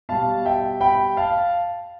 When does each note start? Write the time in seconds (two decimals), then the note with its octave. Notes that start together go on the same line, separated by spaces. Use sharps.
0.09 B2 G3 F5 A5
0.45 E5 G5
0.81 G5 B5
1.17 F5 A5